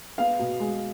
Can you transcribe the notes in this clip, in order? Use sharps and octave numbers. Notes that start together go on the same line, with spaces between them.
B3 F5
B2
G#3